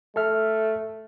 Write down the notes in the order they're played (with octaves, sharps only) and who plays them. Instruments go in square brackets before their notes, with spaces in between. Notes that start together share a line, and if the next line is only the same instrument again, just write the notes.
[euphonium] A3 [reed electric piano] A4 E5 F6